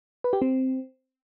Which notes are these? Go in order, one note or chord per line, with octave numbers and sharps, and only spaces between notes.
B4
G4
C4